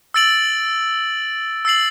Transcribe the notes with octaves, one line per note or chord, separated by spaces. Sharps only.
E6 A6 D7 F#7
E6 A6 C7 F#7